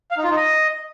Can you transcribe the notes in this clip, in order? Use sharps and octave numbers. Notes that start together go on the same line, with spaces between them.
F5
D#4
F4
D#4
D#5